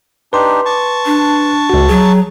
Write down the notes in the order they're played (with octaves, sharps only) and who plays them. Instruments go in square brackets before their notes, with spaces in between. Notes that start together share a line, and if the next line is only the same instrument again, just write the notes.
[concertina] D4 D#4 G4 [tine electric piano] B4 C6
[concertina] A5 C#6
[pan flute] D4
[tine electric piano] C#2 F#4
[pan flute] F#3 [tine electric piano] G#4